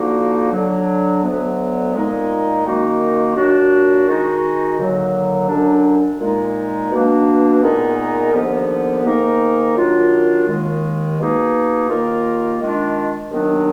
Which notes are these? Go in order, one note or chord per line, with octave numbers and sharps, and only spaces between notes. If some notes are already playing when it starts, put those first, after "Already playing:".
Already playing: D3 F3 A#3 D#4 F#4
D3 F#3 D4
D2 D3 F#3 B3
A#2 G#3 D#4
F#2 D#3 A#3 D#4 F#4
A#2 F#3 D4 F#4
D#3 G#3 D#4 F#4
D#2 D3 F#3
F#2 D3 F#3 D4
A#2 G#3 D#4
B2 A#3 D4
A#2 G#3 B3 D#4 A#4
D#2 D3 F3 B3
G#2 D#3 A#3 D#4 A#4
D#3 F#3 D4 F4
D#2 D#3 G#3
B2 A#3 D#4 G#4
D#2 D#3 A#3 F4 A#4
D#3 G#3 D4 F4
D#2 D#3 F#3 B3 D4